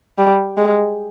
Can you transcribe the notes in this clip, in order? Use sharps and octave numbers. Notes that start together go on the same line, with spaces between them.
G3
G#3